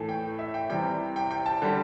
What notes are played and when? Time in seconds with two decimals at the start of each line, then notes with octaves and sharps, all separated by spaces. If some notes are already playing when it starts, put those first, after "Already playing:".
Already playing: A2 E3 A3
0.09 G5
0.39 E5
0.54 G5
0.70 C3 E3 G3 G5
1.16 G5
1.31 G5
1.46 A5
1.62 D3 G3